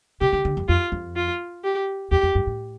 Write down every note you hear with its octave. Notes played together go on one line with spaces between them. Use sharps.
C3 G4
D3
D3
F2
F2 F4
F2
F4
G4
E2 G4
F2
G2
A2